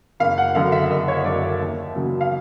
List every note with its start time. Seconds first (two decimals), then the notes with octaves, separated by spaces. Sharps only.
0.20 F#1 F5
0.38 F#5
0.55 F#2 D3 F5
0.72 E5
0.90 F#1 D#5
1.08 C#5
1.25 F#2 D3 D5
1.43 E5
1.59 D#2
1.95 C#3 F#3 A#3
2.21 F5